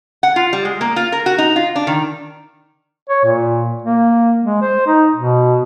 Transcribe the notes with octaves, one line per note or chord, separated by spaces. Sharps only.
F#5
F4
G3
G#3
A#3
F4
A#4
F#4
D#4
F4
D4
D#3
C#5
A#2
A#3
G#3
C5
D#4
B2